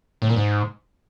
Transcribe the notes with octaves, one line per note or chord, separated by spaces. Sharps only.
A2
A#2
G#2